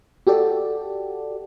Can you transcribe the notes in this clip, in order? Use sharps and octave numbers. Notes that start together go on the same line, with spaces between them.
F#4 G4 A4 D5